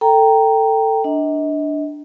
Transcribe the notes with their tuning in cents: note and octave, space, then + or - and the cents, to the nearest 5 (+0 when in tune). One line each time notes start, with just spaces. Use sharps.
A4 +15 G5 +0 A#5 +0
D4 +0 D#5 +35